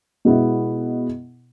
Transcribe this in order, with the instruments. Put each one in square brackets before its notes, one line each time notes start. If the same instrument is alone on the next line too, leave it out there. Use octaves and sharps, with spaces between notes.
[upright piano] B2 G#3 B3 E4